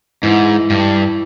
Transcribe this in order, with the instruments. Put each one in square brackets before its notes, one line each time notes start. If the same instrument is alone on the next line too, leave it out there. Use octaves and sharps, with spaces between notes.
[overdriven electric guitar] G#2 [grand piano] E3
[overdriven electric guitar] G2